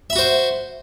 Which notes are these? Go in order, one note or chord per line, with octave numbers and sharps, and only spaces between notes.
F#4 C5 E5 B5